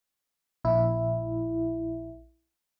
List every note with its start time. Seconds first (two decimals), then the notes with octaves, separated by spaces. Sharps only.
0.64 A#1 E4